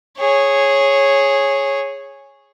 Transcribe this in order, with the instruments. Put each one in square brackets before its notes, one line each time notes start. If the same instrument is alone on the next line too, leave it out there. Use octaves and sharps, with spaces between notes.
[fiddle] G#4 C#5